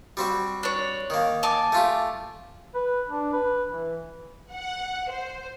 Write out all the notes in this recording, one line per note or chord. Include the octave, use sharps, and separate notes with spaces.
G3 C4 F#4
D4 C#5
D#3 A#3
G#5 A5 D6
A3 F4 G4
B4
D4
B4
E3
F#5
C5